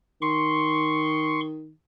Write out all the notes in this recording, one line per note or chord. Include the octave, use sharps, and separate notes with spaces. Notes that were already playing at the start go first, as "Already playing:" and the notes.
D#3 C6 C#6